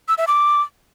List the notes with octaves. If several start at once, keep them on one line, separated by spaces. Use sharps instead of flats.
E6
E5
D6